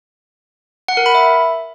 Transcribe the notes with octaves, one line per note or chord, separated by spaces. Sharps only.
F#5
A#4
B5
E5